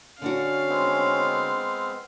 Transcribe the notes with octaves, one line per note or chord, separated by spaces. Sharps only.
D3 C#4 D4 F#4 F5
G#3 B3 C4